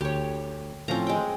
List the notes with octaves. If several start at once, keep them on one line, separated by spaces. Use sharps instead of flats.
D2 G4 C#5
A2 F3 C4 C#4 A#5
G#3 G5